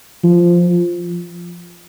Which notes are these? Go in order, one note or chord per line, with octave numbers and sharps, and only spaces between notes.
F3